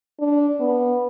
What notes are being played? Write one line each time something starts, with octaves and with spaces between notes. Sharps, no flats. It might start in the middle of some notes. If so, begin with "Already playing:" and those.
D4
B3